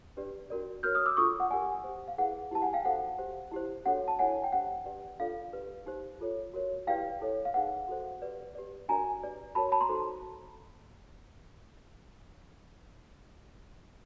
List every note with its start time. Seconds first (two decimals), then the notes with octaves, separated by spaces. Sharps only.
0.17 D4 G4 B4 D5
0.50 D4 F#4 A#4 D5
0.83 F#4 A#4 C#5 F6 G6
0.95 D#6 F6
1.06 D6 E6
1.17 D4 F4 A4 C#6 D#6
1.40 F#5
1.50 G4 A#4 D5 F#5 G#5
1.84 G4 C5
2.08 F5
2.18 E4 G#4 B4 F#5
2.51 E4 G4 B4 A5
2.62 F#5 G#5
2.73 F5 G5
2.85 D#4 F#4 A4 C5 F#5
3.18 G4 C5
3.52 E4 G4 C5
3.86 D4 F#4 A4 C#5 F#5
4.08 A5
4.19 E4 A4 C#5 F#5 G#5
4.44 G5
4.52 D4 G4 C5 F#5
4.86 G4 B4 D5
5.19 D4 F4 A4 D5 F5
5.53 G4 B4 D5
5.86 D#4 G4 C5
6.20 F4 A4 C#5
6.54 F#4 A#4 C#5
6.87 E4 G4 B4 D5 F5 G5
7.21 E4 A4 C#5
7.45 F5
7.54 D#4 G#4 B4 F#5
7.88 F#4 A4 C5
8.22 G4 B4 D5
8.55 G4 B4 D5
8.88 D4 F#4 A#4 D5 G#5 A#5
9.23 G4 B4 D5
9.55 F#4 A#4 C#5 A5 B5
9.72 A5 B5
9.81 A#5 C6
9.89 D#4 F#4 A4 C5